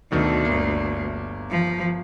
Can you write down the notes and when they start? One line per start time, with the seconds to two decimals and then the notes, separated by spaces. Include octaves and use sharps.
0.12 D2 B2 D#3 A3
0.45 G1 A#3
1.50 F3